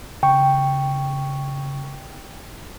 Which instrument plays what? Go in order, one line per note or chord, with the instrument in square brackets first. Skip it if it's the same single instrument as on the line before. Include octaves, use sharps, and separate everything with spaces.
[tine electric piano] C#3 C#6 [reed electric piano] G5